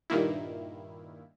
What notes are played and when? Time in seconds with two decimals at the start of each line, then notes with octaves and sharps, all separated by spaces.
0.10 G2 A#2 D#3 A#3 E4